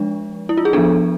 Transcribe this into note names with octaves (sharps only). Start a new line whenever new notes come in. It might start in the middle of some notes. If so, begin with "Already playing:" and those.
Already playing: F3 G#3 D4
E4
F4
G#4
F3 B3 D4 A4